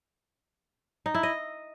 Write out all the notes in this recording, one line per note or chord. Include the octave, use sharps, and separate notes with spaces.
D#4
E4
D#5